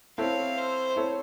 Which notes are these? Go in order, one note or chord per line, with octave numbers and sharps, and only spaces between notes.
C4 E4 A4 C#5 F5
C5
C4 E4 A4 C#5